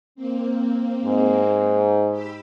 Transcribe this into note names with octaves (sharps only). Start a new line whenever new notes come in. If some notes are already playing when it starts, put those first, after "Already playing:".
A#3 C4
G#2
G4 B5 E6